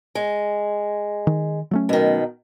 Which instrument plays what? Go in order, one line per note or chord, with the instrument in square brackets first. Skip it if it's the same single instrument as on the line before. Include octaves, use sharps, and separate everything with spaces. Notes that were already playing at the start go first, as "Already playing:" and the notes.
[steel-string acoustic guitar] G#3
[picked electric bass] D#3
F#3 A3 C#4
[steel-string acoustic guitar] B2 D#3